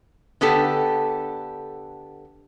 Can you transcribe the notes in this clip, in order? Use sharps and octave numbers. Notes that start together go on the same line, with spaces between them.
D3 B3 G4 A4